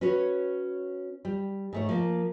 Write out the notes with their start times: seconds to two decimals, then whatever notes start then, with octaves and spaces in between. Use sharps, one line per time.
0.01 C#4 F#4 B4 C#5
1.25 G3
1.73 G#2 A3 C#5
1.89 F3 A#3